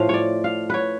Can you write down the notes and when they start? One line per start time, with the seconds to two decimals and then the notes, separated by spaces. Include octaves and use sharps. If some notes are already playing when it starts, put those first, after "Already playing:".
Already playing: A2 F3 F5
0.09 C#5 D5
0.44 F5
0.70 B4 C#5